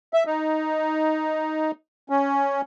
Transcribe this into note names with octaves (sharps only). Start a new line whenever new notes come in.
E5
D#4
C#4